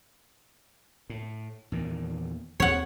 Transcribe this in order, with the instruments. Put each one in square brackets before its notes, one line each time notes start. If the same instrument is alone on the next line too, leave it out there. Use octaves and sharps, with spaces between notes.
[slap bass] A2
E2 A#2 D#3
[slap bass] D#2 C4 [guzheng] C#5 F#5